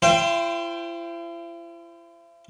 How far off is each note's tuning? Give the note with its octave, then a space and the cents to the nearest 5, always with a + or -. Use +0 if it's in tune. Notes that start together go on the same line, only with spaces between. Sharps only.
E4 +45 C5 +0 G5 +0